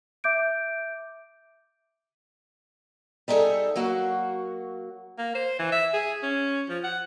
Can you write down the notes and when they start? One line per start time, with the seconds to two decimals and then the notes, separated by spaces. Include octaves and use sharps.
0.24 E5 D6 G6 D7
3.28 G3 D#4 E4 G#4 A4 E5
3.76 F#3 A#3 F#4
5.18 A#3
5.35 C5
5.59 E3
5.72 E5
5.94 G#4
6.23 C#4
6.69 F3
6.84 F#5